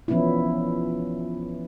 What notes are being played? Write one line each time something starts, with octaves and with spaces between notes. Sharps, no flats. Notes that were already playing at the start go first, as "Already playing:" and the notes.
E3 F3 B3 C#4 D4 E4